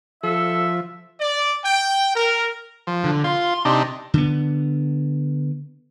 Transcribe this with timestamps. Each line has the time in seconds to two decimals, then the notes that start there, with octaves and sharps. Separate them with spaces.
0.23 F3 A4 E5
1.20 D5
1.64 G5
2.14 A#4
2.87 F3
3.04 D3
3.24 F4 C6
3.65 C3 D4 D#4
4.14 D3 B3